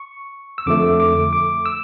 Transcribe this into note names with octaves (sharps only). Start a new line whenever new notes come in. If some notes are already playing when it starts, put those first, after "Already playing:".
Already playing: C#6
E6
F2 D3 F3 A3 D6
D6
D6
E6